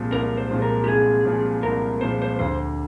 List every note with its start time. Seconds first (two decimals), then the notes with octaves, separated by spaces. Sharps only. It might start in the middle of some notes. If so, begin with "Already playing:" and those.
Already playing: C2 A#2 F3 G#3
0.11 C2 A#4
0.37 C5
0.50 A#2 F3 G#3
0.62 A#4
0.84 G4
0.88 C2 G#4
1.25 A#2 F3 G#3
1.63 C2 A#4
2.01 A#2 F3 G#3 C5
2.22 C5
2.39 D2 C5